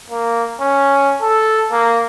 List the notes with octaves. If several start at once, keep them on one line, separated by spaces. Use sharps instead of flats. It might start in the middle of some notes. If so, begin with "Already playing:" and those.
A#3
C#4
A4
A#3